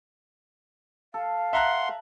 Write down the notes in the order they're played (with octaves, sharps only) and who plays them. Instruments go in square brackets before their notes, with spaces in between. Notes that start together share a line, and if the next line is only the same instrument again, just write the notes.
[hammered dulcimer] A4 [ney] F5
[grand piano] E5 A#5 F#6 [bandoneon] F#5 C6